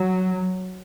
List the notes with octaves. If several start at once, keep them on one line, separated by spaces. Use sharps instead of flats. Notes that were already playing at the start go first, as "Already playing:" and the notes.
Already playing: F#3